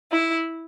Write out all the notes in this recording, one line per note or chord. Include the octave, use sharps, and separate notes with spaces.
E4